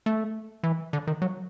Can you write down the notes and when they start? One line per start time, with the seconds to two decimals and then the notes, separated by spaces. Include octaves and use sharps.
0.06 A3
0.63 E3
0.93 D3
1.07 D#3
1.22 F#3